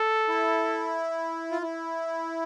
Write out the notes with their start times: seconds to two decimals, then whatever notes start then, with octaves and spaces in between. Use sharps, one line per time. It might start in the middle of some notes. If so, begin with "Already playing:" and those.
Already playing: A4
0.28 E4
1.51 F4
1.62 E4